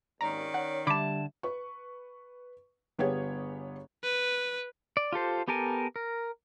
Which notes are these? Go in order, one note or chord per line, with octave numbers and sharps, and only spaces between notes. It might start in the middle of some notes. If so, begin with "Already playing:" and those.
G#1 D#2 G#2 D#3 C#4 D5 A#5
C#5 F#5
D3 G3 E5 A5 B5 D6
B4 C#6
G1 B3 G4 G#4 C#5 G#6
B4
D5
F4 G4 A4 C5
B3 G4 A4 A#4 G#5
A#4